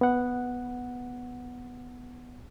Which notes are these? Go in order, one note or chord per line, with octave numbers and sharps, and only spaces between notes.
B3 F#5